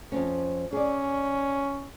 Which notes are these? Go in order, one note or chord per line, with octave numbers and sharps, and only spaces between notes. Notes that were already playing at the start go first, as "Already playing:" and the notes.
F2 C4 C#4
C#4 G#4 D5